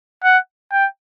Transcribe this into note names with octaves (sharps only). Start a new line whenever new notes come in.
F#5
G5